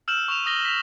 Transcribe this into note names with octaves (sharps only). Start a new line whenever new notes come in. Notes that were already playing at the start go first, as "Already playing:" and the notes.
E6 F6 G6 E7 F#7
C#6 E7 F7
D#6 A#6 G7
B6 F7